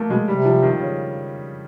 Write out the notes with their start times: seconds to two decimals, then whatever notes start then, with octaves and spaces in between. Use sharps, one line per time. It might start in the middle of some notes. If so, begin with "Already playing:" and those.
Already playing: A3 A#3
0.10 B2 G#3
0.28 C3 G3
0.45 F3
0.63 D#3
0.80 C#3